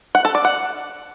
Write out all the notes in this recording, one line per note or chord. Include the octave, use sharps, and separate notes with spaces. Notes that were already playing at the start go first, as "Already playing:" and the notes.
F#5
A4
D5
F#5